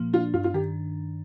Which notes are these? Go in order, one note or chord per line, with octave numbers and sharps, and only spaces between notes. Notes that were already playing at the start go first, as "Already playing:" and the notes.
Already playing: A#2 F3 A#3
D4 F4
G2 F4
F4
D#3 G4